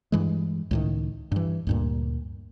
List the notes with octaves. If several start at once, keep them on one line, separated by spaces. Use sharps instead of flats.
G2 E3 G#3
C#2 A2 D#3
G2 E3
D2 G2 A#2